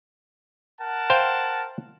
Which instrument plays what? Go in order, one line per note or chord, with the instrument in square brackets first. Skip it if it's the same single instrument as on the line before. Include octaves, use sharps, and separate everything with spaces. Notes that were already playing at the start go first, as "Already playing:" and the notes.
[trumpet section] A#4 F#5 A5
[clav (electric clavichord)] C5 F5 G5